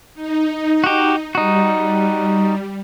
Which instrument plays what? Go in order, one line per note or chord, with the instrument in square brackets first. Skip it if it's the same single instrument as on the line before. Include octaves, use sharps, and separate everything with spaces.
[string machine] D#4
[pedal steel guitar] F#4 G4
[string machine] G3 [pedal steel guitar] D#4 F#4